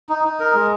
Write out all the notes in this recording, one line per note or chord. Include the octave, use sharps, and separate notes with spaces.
D#4
D#4
A#4
G#3